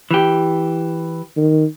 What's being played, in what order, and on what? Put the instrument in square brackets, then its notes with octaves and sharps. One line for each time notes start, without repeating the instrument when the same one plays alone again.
[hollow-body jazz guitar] E3 G4
[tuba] D#3